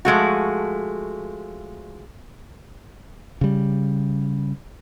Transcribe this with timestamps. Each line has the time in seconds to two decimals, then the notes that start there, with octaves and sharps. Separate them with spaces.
0.05 F3 G#3 A3 F#4
3.41 C#3 G3